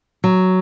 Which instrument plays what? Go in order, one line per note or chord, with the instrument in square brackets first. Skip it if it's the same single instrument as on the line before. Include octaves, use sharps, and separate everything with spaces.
[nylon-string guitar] F#3